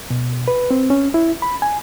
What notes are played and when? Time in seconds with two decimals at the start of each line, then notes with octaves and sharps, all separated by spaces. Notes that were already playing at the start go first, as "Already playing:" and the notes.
0.10 B2
0.48 B4
0.71 C4
0.90 C#4
1.14 E4
1.42 B5
1.62 G#5